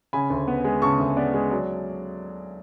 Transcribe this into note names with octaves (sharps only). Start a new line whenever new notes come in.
C#3 G#5 B5
D2
B3
G#3
C#3 A5 C#6
D2
B3 D5
G#3
F#3 D5